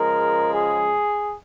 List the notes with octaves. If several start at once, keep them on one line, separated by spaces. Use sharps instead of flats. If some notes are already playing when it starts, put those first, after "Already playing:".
Already playing: C#3 F3 G#3 A#4
G#4